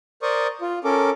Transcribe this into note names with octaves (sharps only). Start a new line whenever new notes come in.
A#4 C5 D5 C#6 D#6
F4
C#4 A4 A#4 D6